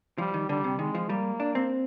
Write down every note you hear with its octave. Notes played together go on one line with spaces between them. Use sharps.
F3 G3
D#3
D3 G3
C3
D#3 G#3
F3
G3 A#3
D4
C4